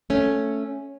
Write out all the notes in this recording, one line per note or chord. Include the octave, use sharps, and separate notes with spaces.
A3 C#4